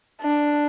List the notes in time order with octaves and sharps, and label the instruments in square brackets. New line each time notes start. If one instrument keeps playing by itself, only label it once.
[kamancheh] D4